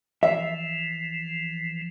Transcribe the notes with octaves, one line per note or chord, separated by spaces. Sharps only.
E3 F3 E5